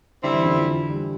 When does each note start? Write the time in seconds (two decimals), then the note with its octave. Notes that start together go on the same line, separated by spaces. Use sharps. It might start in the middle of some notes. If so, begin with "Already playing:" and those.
0.23 D3 G3 C4 E4
0.34 E3
0.45 D3
0.57 F3
0.90 G3